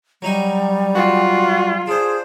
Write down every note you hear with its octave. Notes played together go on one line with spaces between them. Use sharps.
F#3 G3 D#4 G#5
F4 F#4
D4 G#4 C5